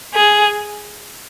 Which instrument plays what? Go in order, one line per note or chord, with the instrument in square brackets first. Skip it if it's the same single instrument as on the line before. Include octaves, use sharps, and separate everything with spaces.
[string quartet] G#4